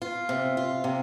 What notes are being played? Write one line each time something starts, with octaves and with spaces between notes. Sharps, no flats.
F4
C3
F4
C3